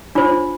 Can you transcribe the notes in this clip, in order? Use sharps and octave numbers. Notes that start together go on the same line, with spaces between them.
D4 F4 C5